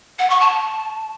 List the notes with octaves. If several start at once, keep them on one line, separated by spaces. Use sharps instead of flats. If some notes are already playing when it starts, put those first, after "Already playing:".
F#5
C#6
A5